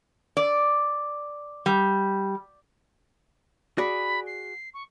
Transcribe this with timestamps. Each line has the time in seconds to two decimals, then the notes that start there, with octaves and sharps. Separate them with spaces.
0.37 D5
1.66 G3
3.78 F#4 G#4 D5 B5
4.26 C7
4.73 C#6